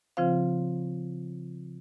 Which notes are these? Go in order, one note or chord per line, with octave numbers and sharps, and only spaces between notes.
C#3 F3 C4 F4 C5 F5